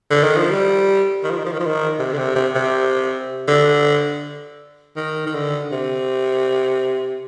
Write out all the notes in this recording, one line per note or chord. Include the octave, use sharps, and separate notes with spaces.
D3
D#3
F3
G3
D#3
F3
D#3
F3
D#3
F3
D#3
C3
D3
C3
C3
C3
D3
D#3
D#3
D3
C3